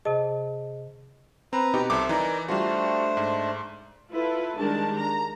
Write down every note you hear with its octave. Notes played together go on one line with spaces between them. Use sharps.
C3 G#4 D#5 A5
C4 B4 A#5
B2 D#4 G4
C2 A4 C5 E5 D6
E3 D#4 A#4 D5
G3 A3 D4 F4 F#4 C5
G#2
E4 F4 A4 B4
D#3 G3 G#3 D4 A#4 A5
A#5